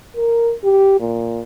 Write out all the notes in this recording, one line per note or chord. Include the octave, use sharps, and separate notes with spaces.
A#4
G4
A#2